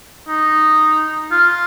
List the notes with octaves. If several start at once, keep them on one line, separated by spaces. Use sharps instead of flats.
D#4
F4